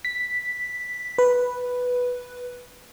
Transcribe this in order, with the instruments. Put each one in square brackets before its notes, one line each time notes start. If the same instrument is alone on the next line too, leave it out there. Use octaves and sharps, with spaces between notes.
[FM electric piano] B6
B4